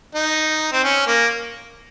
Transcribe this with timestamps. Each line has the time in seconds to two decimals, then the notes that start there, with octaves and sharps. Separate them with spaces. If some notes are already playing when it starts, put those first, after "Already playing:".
0.15 D#4
0.72 C4
0.84 C#4
1.07 A#3